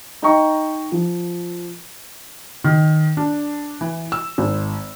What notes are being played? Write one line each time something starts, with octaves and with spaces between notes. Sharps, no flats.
D#4 D#5 G5 A#5 C#6
F3
D#3
D4
E3
E6
G#1